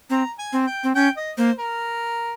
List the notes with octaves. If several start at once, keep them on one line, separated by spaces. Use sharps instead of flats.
C4 A#5
G#5
C4
G5
C4
C#4 G5
D#5
A#3 C5
A#4